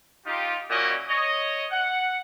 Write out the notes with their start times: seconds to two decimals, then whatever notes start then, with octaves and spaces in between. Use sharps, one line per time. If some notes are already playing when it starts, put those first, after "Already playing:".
0.26 D#4 F4 G4
0.70 A#2 C#4 E4 F#4 D5 D#5
1.09 C#5 D#5
1.71 F#5